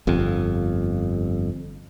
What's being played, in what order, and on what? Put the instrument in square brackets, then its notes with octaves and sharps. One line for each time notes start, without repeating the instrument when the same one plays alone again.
[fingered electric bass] G1 F2